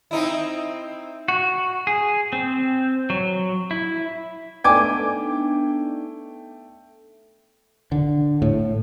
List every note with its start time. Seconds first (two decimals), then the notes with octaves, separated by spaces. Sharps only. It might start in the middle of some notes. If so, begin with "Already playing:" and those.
0.11 C4 D#4 E4
1.28 F#4
1.87 G#4
2.33 C4
3.10 F#3
3.71 E4
4.64 A3 B3 D4 D#4 G5 G#5 D6 G#6
7.92 D3
8.42 A2